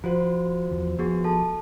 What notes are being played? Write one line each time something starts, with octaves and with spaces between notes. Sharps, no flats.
F3 F4 F#4 C5
E2 F3
F3 B3 F#4 G#4
A4 A5